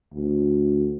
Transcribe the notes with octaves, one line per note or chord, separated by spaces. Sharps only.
D2